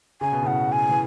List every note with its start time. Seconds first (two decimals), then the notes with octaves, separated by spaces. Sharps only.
0.21 C#3 G#5
0.32 B2
0.43 A2 C#3 F#5
0.72 G#5
0.89 E3